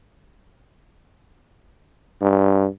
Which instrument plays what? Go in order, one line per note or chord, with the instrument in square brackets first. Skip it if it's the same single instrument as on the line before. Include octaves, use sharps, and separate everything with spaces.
[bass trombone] G2